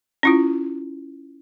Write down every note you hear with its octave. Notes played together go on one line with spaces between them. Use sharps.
C#4 E4 F4